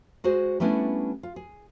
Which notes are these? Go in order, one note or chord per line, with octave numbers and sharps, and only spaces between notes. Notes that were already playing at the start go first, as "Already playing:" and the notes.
G#3 F#4 G#4 C5
G3 A3 B3 C#4 D4 E4
F4
G#4